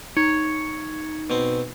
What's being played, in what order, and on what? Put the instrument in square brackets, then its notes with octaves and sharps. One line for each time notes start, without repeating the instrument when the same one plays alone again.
[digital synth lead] D#4 [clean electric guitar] C#5
[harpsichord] B2 C4